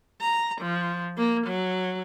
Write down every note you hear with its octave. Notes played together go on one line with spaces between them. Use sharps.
A#5
F3
A#3
F#3